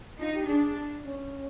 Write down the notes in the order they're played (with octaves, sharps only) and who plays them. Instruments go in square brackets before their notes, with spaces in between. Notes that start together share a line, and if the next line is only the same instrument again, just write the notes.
[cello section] D#4 [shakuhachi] F4
[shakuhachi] G4
[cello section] D4 [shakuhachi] G#4
[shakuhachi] C#4